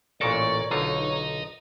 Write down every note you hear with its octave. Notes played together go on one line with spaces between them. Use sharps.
A1 A#2 A4 A#4 C#5 D5 C#6
B1 D3 F4 D#5 A#5